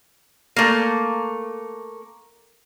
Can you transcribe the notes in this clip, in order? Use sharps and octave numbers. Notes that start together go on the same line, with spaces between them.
A3 A#3